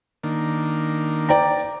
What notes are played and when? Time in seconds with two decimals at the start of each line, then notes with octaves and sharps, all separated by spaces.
0.23 D#3 A#3 D4
1.29 D5 G5 A#5